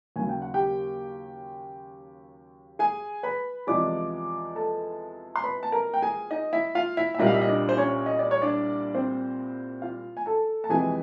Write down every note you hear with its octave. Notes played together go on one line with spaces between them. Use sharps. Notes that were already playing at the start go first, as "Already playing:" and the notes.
D#2 C#3 F#3 G#5
G5
F#5
G4 G5
G#4 G#5
B4 B5
E2 C3 F3 G#3 D5 D6
A4 A5
C6
B4 B5
A5
A#4 A#5
G5
G#4 G#5
D#4 D#5
E4 E5
F4 F5
E4 E5
E5
C2 A#2 G3 A#3 D#4 D#5
F5
E5
D#5
D4 D5
C5
C#4 C#5
D#5
D5
C#5
D4 D5
C4 C5
F4 F5
G#5
A4 A5
A5
F2 C3 E3 G#3 G#4 G#5